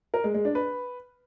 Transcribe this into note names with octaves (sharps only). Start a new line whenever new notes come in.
A#4
G#3
G#3
D4
B4